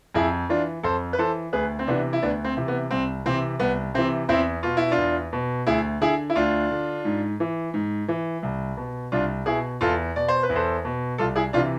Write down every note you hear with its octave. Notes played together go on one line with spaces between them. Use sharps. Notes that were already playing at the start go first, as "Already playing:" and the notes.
F2 E4 G#4
E3 D4 F4
F2 A4 C5
B4
E3 A4 C5
D2 G#4 B4
C4
C3 E3 B3 D4
E4
D2 B3 D4
C4
C3 E3
B3
C2 C4
C3 E3 C4
C2 B3
C3 E3 C4
E2 C4 E4
B2 F4
E4
D4 F4
E2
B2
D2 E4 G#4
D3 E4 G#4
E4
D2 D4 F4
D3
G#2
E3
G#2
E3
C2
B2
C2 D4 F4
B2 E4 G#4
E2 F4 A4
B2 D5
C5
B4
E2
A4 C5
B2
C2 F4 A4
E4 G#4
C3 E3 D4 F4